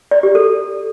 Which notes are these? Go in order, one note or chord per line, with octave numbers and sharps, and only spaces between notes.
D5
G4
A4